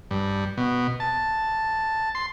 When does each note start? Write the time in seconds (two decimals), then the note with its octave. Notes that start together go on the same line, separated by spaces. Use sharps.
0.11 G2
0.58 B2
1.00 A5
2.15 C6